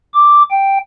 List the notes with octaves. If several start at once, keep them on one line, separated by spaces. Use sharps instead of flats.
D6
G5